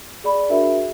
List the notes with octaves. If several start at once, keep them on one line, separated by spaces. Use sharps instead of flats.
G#4 D5 B5
D4 F#4 G#4 A#4 E5